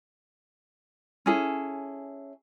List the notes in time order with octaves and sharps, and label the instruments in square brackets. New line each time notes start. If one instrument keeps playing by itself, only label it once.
[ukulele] C#4 E4 G#4 A4